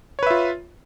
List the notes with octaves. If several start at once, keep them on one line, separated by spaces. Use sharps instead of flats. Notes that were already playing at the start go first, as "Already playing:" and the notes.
F4 B4 C#5 E5